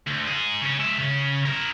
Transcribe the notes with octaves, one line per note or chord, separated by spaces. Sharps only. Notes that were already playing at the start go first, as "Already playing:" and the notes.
D2
D#4 G#4
C#3 C#4
G#3 E5
C#3 C#4
E4 A#4